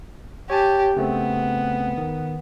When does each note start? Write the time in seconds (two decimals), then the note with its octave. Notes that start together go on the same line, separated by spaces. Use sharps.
0.50 G4 C#5 G#5 A5
0.97 C#3 A3 B3 C4
1.98 D#3